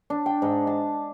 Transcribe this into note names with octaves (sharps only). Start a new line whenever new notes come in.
D4
G5
G#2
A5